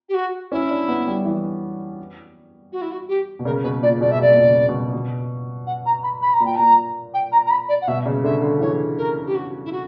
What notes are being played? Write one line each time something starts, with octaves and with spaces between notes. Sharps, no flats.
G4
F#4
C#4 E4
D4
B3
G3
E3
F#4
E4
F#4
G4
B2
C#3 A#4
B2 B4
A#2 D5
B2 D5
E5
B2 D5
A#2
B2
C#3
B2
B2
F#5
A#5
B5
B5
A#5
A#2
G5
A#2 A#5
G5
A#5
A#5
B5
D5
F#5
B2 E5
C#3
D3 E5
D3
E3 C#5
A#4
G4
F#4
E4
F#4